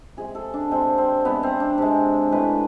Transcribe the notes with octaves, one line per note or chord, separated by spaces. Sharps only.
C3 G#3 G#4
A4
D4
C3 G#3 C4
C4
C3 G#3 B3
C4
D4
C3 G#3
A2 G#3 B4